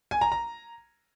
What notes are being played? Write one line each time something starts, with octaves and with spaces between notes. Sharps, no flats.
G#5
A#5
A#5